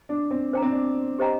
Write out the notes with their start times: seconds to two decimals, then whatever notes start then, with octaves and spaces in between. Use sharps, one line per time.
0.09 D4
0.31 C4
0.53 D4 C5 G5 A#5
0.62 C4
0.72 D4
1.19 G4 C5 D#5 G5 A#5